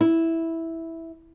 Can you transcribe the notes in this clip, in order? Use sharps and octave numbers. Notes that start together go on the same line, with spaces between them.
E4